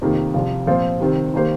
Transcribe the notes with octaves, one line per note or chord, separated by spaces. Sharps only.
F2 C3 D#3 A#3 D#4
C2 C3 F3
A#2 F3 C4 F4 C5
C3 D#3 G3 C4
D#3 A#3 G4 C5